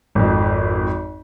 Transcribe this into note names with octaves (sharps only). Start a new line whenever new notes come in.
G#1 F2